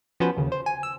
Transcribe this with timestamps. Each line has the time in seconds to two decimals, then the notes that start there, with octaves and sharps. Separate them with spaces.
0.20 F3 B3 C#4 F#4 B4 C5
0.37 D#2 C#3
0.52 C5
0.66 G#5
0.83 E6